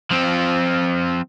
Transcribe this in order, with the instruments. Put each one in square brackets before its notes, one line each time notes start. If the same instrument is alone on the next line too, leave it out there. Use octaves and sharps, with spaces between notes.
[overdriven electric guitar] F3 C4